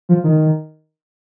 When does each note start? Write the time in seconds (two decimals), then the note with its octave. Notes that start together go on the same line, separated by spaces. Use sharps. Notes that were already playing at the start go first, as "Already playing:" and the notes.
0.09 F3
0.24 D#3